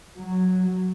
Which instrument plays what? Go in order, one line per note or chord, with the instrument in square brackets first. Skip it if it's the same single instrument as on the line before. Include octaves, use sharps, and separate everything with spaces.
[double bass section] F#3